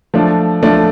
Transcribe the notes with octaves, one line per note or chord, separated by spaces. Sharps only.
F3 A3 D4
F3 A3 D4